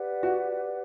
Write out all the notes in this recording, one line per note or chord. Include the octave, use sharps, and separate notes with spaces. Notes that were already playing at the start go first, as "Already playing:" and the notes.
Already playing: G4 B4 D5 F#5
F#4